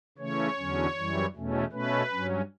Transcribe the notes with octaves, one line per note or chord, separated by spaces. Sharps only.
C#3 E3 A3 C#4 C#5
E2 D3 F#3 C#4
F#2 E3 G3
E2 B2 A3 C#4
B2 A3 C#4 B4
G2 F#3 C#4